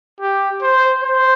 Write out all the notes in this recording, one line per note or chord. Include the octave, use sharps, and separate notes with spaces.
G4
C5
C5